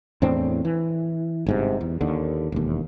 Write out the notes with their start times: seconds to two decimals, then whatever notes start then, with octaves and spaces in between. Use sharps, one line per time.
0.22 E2 A2 C4 D4
0.65 E3
1.46 G1 G#2 C3
1.81 E2
2.01 D#2 D3
2.52 E1 D#2